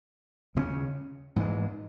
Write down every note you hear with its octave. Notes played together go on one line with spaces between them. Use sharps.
D#2 C#3 G#3 C#4
G#2 E3 G#3